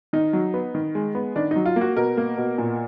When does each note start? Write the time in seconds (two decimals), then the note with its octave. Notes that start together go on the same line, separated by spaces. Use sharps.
0.13 D#3 D#4
0.33 F#3
0.54 B3
0.75 D#3
0.95 G#3
1.15 B3
1.36 D#3 D4
1.51 F#3 D#4
1.66 F4
1.76 A#3
1.81 F#4
1.96 B2 A#4
2.17 A#3
2.37 B2
2.58 A#2